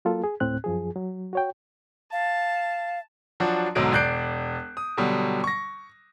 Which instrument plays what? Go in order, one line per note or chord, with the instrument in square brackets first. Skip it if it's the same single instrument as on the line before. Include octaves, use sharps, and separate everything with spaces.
[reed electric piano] F#3 A#3 F4 A4
G#4
D2 A2 C4 F#6
F#2 F3 G#4
F#3
F#4 C#5 G5
[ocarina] F5 [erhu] A5
[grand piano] F3 F#3 D4 F#4
B1 G#2 D3 F#3 D#4 D7
E1 D5 F#6 G6 C7 D7
D#6
B2 D3 F#3 G3
C#6 A#6